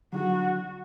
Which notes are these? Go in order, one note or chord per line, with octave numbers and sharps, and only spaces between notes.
D3 F#3 F#4